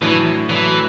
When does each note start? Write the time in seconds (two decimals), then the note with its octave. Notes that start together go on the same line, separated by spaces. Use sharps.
0.01 A2 E3 F#3 A3 D4
0.49 A2 E3 F#3 A3 D4